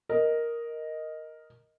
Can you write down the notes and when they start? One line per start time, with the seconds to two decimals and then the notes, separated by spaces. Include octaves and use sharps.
0.09 A#4 D#5